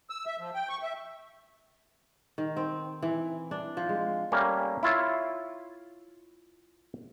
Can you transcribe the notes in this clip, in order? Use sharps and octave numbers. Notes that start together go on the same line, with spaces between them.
E6
E5
F3
G5
C#6
E5
D#3
C4
E3
D4
F3
G#3
G3 A3 A#3 C#4
E4 F4 C#5 E5